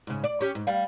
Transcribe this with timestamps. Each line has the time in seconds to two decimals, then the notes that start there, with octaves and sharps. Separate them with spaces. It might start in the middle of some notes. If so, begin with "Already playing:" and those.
0.07 G#2 C#3
0.24 D5
0.41 C#4 G4
0.55 G#2
0.67 G3 F5